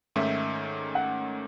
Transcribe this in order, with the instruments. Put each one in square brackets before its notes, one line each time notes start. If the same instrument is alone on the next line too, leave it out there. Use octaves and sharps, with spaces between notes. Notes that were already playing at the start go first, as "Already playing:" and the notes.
[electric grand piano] G#2 D#3 A3 C#4 [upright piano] E5
[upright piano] F#5